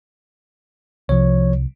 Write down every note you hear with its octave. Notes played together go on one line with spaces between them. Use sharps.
C2 F3 C#5